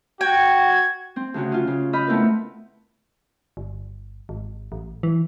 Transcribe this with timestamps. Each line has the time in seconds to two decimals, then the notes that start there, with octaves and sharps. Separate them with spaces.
0.21 F#4 G5 G#6
1.16 C4
1.34 D2 C#3 F#4
1.52 C#4 F4
1.67 C#3
1.93 D#5 B5 F6 G6
2.07 A3 B3 C4 E4 A#4 B4
3.57 G1
4.29 G#1
4.72 A1
5.03 E3